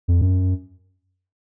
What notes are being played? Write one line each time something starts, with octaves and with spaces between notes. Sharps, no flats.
F2
F#2